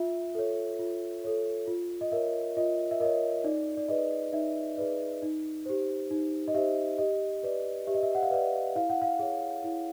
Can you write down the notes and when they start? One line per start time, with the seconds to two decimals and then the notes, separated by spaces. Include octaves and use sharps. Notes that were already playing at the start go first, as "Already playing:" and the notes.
Already playing: F4 E5
0.35 A4 C#5
0.79 F4
1.24 A4 C#5
1.67 F4
2.01 D#5
2.11 A#4 C#5 E5
2.57 F4 D#5
2.91 E5
3.00 A#4 C#5 D#5
3.44 D#4 D5
3.77 D5
3.88 G#4 B4 D5 D#5
4.33 D#4 E5
4.77 G#4 B4 D5
5.22 D#4
5.66 G4 C5
6.11 D#4
6.48 D#5
6.54 G4 C5 E5
6.98 G4 D#5
7.43 B4 D5
7.87 G4 E5
7.94 D#5
8.03 E5
8.15 F#5
8.22 F5
8.31 B4 D5 E5
8.75 E4 F5
8.89 F#5
9.01 F5
9.19 G#4 C#5
9.64 E4